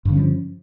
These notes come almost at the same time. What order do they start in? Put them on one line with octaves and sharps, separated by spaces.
G2 D3 C#4 F3